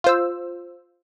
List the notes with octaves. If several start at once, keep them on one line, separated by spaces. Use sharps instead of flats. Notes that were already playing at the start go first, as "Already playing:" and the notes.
F4 C5 E6